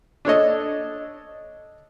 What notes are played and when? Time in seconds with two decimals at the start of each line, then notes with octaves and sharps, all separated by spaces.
0.25 D4 A4 C#5 D#5